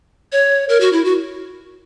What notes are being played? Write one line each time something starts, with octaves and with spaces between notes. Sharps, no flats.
C#5
A#4
F#4
E4
F#4